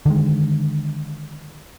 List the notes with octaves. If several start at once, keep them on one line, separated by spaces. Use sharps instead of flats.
D3 D#3 G3 G#3